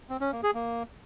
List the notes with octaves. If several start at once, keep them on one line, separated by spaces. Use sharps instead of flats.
C4
C#4
A#3
G#4
A#3